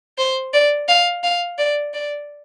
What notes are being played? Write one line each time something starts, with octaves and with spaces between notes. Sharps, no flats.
C5
D5
F5
F5
D5
D5